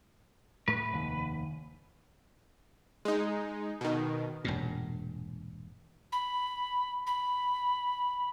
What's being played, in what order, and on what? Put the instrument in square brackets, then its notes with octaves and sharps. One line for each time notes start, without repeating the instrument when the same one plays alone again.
[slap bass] A2 A3 [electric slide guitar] B4
[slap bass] F1 D#2 D#3
[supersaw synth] G#3 D#4
B2 D#3
[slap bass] E1 G2 A#2
[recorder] B5
B5